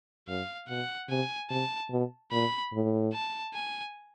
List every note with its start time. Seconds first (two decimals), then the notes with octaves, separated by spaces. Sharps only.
0.28 F#2 F5
0.68 B2 F#5
1.09 C3 G#5
1.50 C3 A5
1.90 B2
2.32 A#2 B5
2.73 A2
3.13 A5
3.54 G#5